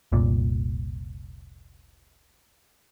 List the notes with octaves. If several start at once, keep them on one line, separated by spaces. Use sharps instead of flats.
F1 C2 A#2